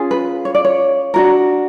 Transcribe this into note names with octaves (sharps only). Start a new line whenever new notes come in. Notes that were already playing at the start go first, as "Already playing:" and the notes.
Already playing: C#4 F4 G#4
B4
C#5
D5
C#5
D4 F#4 A#4